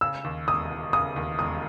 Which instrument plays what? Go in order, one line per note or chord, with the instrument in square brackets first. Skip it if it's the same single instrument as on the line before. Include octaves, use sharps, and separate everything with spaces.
[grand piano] C#3 [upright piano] E6
[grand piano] D#2
[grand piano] E1 [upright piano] D#6
[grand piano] E1
[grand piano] C#3 [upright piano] D#6
[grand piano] D#2
[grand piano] E1 [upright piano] D#6